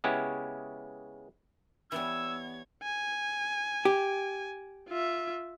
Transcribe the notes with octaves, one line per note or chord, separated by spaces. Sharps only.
C#3 G#3 B3 C#4 E4 G4
E3 G3 B3 C#5 E6 G#6
G#5
G4
F4 E5